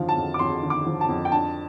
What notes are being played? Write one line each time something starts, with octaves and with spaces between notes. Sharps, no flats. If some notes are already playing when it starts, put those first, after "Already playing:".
Already playing: F2 D3 F3 F5
A5
F2
D6
F2 C6
D3
D6
F3
A5
F2
G5
D4 A5